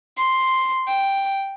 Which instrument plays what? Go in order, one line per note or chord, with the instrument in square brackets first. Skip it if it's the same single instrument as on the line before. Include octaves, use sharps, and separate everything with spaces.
[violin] C6
G5